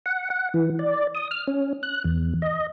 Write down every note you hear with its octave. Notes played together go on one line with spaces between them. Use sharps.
F#5
F#5
E3
D5
D#6
F6
C#4
F#6
E2
D#5